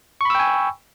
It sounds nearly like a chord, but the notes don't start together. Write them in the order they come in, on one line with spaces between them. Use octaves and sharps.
C#6 B5 E6 G5 G#5